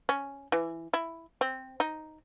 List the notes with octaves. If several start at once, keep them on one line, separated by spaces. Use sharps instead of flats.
C#4
E3
E4
C4
D#4